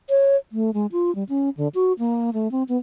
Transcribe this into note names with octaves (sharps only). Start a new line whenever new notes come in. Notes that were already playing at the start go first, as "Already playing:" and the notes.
C#5
A3
G#3
F4
G3
C#4
D3
F#4
A#3
A3
C4
B3